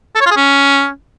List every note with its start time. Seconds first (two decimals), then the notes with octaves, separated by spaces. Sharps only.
0.15 A4
0.21 C#5
0.26 F4
0.31 G#4
0.37 C#4